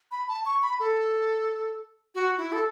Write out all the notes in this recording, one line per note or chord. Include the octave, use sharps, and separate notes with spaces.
B5
A5
C#6
B5
A4
F#4
E4
A4